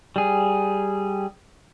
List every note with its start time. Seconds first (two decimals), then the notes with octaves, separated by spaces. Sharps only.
0.16 G3 G#4